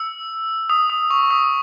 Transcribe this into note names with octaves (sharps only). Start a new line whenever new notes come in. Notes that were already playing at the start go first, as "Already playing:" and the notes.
Already playing: E6
D#6
D#6
C#6
D#6